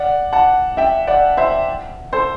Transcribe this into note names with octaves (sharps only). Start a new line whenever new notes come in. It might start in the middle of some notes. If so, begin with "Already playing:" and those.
Already playing: D5 F#5
F#5 A5
E5 G5
D5 F#5
C5 E5
A4 C5